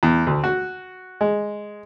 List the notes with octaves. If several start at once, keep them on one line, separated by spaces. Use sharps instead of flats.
E2
D2
F#4
G#3